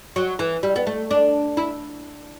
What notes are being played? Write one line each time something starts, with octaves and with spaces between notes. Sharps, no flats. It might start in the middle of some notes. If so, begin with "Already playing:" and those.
F#3
E3
G3
B3
A3
D4
E4